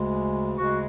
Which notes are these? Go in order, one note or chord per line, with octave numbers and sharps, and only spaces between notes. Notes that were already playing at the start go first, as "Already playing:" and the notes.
Already playing: D2 C#3 G#3
D2 C#3 G#3 F#4